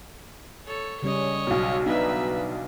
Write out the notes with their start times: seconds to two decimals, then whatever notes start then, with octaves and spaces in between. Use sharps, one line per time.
0.66 A4 C#5
1.03 C#3 G3 C#4 C#5 D#5
1.47 B1 B2
1.86 B3 D4 D#4 B4 E5